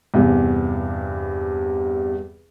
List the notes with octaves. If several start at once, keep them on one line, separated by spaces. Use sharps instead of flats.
E2 G2 C3